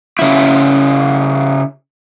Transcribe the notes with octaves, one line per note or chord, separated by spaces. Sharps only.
C#3 E4